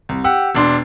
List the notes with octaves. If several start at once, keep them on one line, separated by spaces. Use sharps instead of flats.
C2
G4 F#5 E6
E1 D4 C6